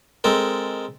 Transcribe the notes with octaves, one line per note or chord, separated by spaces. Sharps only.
G#3 C4 A4 A#4